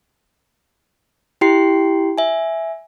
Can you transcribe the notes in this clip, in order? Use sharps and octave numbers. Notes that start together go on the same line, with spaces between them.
E4 G4 G5 C6 C7
E5 G#5